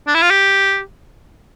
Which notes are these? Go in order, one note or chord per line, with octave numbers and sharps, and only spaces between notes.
D4
E4
F4
G4